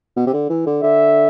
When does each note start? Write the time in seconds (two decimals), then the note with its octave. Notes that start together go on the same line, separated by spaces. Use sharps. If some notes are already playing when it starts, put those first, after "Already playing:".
0.16 B2
0.27 C3
0.34 D3
0.49 E3
0.66 D3
0.83 D3 E5